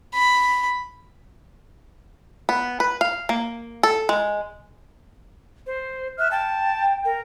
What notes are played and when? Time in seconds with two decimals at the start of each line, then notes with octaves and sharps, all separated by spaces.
0.14 B5
2.49 B3
2.80 B4
3.01 F5
3.29 A#3
3.83 A4
4.09 G#3
5.67 C5
6.18 E5 F6 F#6
6.31 G5 A5
7.05 A#4